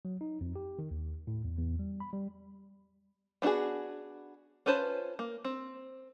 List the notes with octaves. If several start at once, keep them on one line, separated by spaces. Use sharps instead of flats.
F#3
D#4
F2
G4
D#3
D#2
A2
E2
E2
G3
B5
G3
B3 D4 F4 F#4 G#4
C#4 F4 B4 C5 A5
A#3
C4